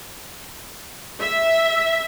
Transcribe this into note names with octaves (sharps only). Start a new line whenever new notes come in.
E5